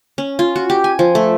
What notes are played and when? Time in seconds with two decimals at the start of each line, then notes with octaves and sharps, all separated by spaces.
0.18 C#4
0.39 F4
0.56 F#4
0.70 G4
0.84 G#5
0.99 F3
1.15 A3